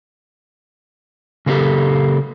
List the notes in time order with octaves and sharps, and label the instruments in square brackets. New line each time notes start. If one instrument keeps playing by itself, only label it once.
[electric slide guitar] C#3 A#3 E4 G4 A4